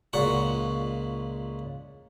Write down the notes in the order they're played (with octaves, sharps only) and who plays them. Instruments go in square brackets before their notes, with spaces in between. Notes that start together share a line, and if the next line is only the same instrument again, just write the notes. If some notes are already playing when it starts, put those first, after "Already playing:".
[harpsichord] C#2 A#2 F#5 C#6